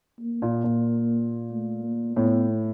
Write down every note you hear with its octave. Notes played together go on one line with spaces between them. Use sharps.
A#3
A#2
A#2
A3
A#3
A2 B3